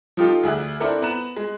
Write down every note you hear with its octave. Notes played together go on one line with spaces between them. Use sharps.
F3 D#4 F4 G4 A4
D2 G#4 E5 F#6
C4 D4 E4 A4 A#4
B3 A#5 F#6 E7
G#3